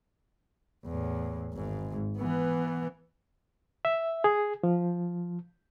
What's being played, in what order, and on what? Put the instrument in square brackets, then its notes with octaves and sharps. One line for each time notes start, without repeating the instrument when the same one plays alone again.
[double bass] E2 A2
G#1 G#2
E3 B3
[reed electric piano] E5
G#4
F3